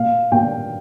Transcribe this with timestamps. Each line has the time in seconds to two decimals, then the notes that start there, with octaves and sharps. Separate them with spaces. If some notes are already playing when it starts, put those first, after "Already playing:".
Already playing: A#2 F5
0.32 A#2 G5